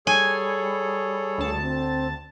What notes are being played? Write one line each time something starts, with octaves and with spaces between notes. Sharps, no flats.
G3 G#4 A4 C#5 G#5
D2 A5
C4